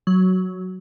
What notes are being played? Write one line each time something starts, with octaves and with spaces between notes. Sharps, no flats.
F#3